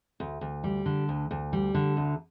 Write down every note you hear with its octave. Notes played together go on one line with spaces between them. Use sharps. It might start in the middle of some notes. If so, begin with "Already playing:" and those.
D2
D2
G3
D3
D2
D2
G3
D3
D2